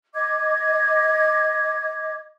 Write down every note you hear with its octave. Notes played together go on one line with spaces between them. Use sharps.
D#5 D6 G#6